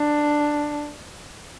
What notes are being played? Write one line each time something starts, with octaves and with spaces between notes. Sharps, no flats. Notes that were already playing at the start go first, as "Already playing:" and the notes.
Already playing: D4